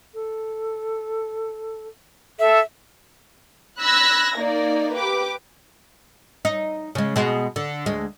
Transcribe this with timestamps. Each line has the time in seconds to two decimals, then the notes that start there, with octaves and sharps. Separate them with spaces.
0.14 A4
2.39 A4 E5
3.80 B5 E6 F#6 G#6 A#6
4.35 A#3 D#4 D5
4.95 G4 B4 D6
6.45 D#4
6.95 C#3 G#3
7.16 B2 G#3
7.56 D3
7.86 D2 G#3